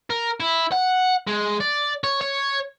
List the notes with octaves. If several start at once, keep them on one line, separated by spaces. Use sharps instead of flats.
A#4
E4
F#5
G#3
D5
C#5
C#5